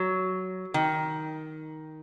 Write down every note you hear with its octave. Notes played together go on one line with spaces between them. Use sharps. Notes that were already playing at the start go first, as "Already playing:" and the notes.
Already playing: F#3
D#3